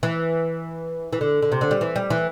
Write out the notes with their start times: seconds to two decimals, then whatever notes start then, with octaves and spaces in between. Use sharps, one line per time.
0.03 E3
1.13 E3
1.21 D3
1.42 D3
1.52 C3
1.61 D3
1.71 G3
1.81 E3
1.96 G3
2.10 E3